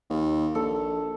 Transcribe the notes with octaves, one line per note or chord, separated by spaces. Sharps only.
D#2
A#1 A4